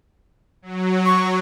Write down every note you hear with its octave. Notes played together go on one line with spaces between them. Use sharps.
F#3
C#6